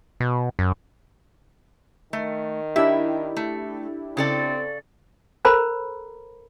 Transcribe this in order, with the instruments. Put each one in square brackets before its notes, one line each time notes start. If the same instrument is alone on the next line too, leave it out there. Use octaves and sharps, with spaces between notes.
[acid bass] B2
F#2
[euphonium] D#3 [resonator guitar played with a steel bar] A3
[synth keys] D4 E4 G4 [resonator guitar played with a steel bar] E5
[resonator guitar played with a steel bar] A3
[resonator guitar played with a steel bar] C#3 A4 D5 [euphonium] C4
[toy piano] A4 A#4 C5 A#5 B5